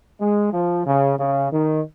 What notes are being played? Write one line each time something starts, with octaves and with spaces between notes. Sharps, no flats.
G#3
F3
C#3
C#3
D#3